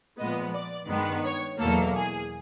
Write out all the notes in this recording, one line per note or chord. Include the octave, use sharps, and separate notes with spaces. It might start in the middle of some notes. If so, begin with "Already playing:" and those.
A#2 F3 G#3 B3 D#5
D5
G2 D#3 G#3 B3
C#5
E2 B2 F#3 A#3 A4
G#4